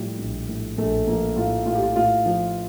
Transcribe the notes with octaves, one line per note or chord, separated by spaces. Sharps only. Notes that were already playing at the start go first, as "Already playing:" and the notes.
Already playing: A2 F3 G3
A#1
A2
A#1 A3
F3 A#3
A2 F4
A2 F4
G4
F4
A2 F4
F3